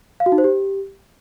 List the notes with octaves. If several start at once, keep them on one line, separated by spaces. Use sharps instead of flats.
F5
F#4
D#4
C5
G4